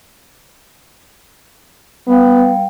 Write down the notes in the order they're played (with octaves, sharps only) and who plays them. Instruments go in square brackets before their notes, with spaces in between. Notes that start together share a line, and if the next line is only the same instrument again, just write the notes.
[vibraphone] G3 F5 G5 [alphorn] B3